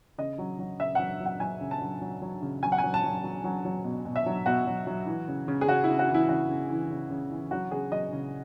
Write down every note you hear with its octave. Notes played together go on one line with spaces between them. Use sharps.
C#3 D#5
F#3
F#3
C#3 E5
F#3 F#5
F#3
F#5
F#3 G#5
C#3
A5
F#3
F#3
F#3
C#3
F#3 G#5
F#5
F#3 G#5
A5
F#3
F#3
F#3
F#3
B2
B2
E5
F#3
B2 F#4
F#3
F#3
E3
C#3
C#3
G#4
C#3 F#4
E4
C#3
F#4
E3
E4
C#3 F#4
C#3
E3
C#3
C#3
E3
F#3 F#4
C#3 G#4
F#3 D#5
C#3